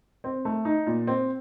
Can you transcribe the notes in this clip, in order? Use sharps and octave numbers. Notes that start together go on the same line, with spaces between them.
C4
A3
D#4
A#2
C4